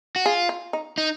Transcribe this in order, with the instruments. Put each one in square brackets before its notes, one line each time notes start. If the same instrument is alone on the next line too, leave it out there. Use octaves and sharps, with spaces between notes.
[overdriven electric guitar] F#4
[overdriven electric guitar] F4 [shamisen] G#4
[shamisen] F4
D#4
[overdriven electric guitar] D#4